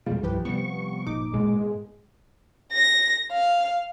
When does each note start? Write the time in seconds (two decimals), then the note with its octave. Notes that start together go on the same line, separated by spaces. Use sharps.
0.06 E2 B2 F3 G3 G#3 F4
0.23 C2 G2 E3 F3 G4 B4
0.45 C3 G3 B3 C#6
1.06 G1 A#2 D#4 D6
1.33 G#2 B2 G#3
2.72 A#6
3.32 F5